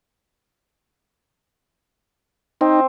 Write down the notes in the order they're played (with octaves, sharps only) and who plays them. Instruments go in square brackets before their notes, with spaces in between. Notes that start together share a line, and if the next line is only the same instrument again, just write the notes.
[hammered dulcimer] C4 [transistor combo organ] D#4